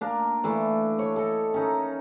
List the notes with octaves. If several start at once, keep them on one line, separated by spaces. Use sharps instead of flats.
A#3 D4 A#4
E3 A3 D4
C#5
A4 D#5
C#4 D#4 A#4